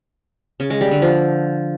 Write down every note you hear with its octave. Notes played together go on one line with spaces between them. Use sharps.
C#3
G#3
G3
D3
F3